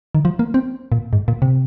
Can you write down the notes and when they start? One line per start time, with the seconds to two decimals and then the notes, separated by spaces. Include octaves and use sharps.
0.15 D#3
0.25 F3
0.39 A#3
0.54 C4
0.92 A#2
1.13 G#2
1.28 A#2
1.42 C3